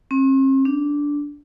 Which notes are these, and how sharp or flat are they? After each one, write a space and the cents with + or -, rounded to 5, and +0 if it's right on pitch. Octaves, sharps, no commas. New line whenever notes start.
C4 +45
D4 -10